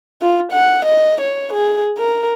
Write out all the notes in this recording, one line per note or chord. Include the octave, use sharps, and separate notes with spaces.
F4
F#5
D#5
C#5
G#4
A#4